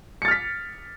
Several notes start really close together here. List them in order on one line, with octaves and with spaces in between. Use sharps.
C#7 A6 F6 B6